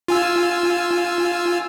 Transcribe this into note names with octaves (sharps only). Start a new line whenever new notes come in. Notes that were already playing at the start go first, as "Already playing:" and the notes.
F4 G#5 E6